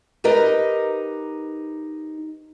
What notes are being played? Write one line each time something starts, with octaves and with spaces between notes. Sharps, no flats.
D#4 G4 A#4 B4 D#5